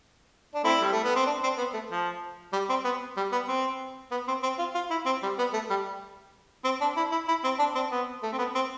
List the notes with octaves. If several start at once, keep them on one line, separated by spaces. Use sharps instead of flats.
D4
A3 C4 E4
G3
A3
B3
C4
D4
C4
B3
A3
F3
G3
C4
B3
G3
B3
C4
B3
C4
C4
F4
F4
E4
C4
G3
B3
A3
G3
C4
D4
E4
E4
E4
C4
D4
C4
B3
A3
C4
B3
C4